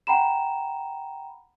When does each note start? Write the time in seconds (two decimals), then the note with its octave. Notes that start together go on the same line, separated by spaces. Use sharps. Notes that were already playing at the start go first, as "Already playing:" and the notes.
0.07 F#5 G5 A#5 B5 E7